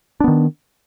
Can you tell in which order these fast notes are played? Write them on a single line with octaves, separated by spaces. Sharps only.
D4 B3 D#3